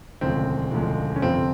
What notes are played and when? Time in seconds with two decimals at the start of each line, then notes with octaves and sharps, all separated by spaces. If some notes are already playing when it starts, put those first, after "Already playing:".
0.21 E1 D2 C#3 F3 G#3 C4
0.71 E1 D2 C#3 F3 G#3
1.16 C#4
1.22 G1 F2 C3 F3 C4